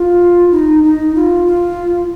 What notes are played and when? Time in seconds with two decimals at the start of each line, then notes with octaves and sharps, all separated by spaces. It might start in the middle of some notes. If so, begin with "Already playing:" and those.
Already playing: F4
0.51 D#4
0.83 D#4
1.15 F4
1.46 F4